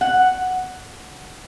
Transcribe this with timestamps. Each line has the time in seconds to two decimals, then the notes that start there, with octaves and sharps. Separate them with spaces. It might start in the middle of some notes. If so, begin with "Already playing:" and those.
0.01 F#5